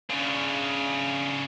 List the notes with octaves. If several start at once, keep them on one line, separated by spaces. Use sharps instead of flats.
C#3 D4